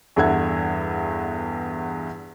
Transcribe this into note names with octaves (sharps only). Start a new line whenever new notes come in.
E2 G2 A4 E5 F#5 G#6